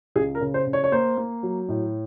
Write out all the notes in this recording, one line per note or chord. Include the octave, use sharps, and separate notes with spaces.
C#2 G#4
A#4
C#3
C5
C#3
C#5
C#5
A#3 C5
A#3
F#3
A2